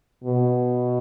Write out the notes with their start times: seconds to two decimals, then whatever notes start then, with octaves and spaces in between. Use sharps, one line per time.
0.24 B2